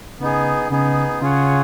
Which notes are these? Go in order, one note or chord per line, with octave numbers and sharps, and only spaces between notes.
C#3 B3 D#4 G#4
C#3 B3 D#4 G#4
C#3 F4 G#4 C#5 F#5